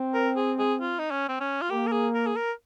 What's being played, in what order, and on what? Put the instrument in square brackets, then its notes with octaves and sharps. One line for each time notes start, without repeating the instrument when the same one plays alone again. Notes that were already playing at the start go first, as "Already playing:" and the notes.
Already playing: [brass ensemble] C4
[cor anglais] A#4
G#4
G#4
F4
D#4
C#4
C4
C#4
F4
[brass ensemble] A#3 [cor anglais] G4
[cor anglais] A#4
G#4
A#4
G#4
A#4